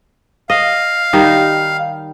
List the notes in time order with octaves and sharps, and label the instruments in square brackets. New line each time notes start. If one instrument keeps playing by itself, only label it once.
[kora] D#5 [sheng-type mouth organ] F5
[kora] D#3 G3 D#4